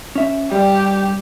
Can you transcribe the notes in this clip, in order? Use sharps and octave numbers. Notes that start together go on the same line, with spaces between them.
C#4 E5
G2 G3 G4